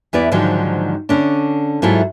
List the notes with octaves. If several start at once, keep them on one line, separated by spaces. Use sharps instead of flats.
E2 B3 E4 D5
G#2 D3 D#3 F3 F#3
D3 C#4 D4
G#2 F#3 E4 F4 A4